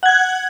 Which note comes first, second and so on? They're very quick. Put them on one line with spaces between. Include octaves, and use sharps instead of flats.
F#5 G#6 F#6